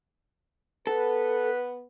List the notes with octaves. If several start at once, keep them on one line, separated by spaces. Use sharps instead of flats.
B3 A4 B4